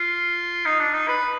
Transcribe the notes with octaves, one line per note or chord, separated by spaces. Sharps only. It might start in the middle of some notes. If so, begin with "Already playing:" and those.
Already playing: F4
D#4
D4
D#4
B4